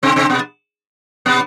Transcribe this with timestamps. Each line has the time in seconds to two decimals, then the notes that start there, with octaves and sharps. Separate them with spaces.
0.03 C3 C4
0.16 C3 C4
0.30 B2 B3
1.26 B2 B3